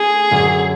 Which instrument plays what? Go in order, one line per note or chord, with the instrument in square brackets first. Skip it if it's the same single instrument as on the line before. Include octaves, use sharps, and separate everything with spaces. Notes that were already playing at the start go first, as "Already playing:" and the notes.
Already playing: [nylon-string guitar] A3 D4 [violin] G#4
[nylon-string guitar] F#2 D3 F#3